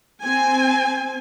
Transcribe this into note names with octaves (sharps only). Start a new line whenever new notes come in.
C4 G#5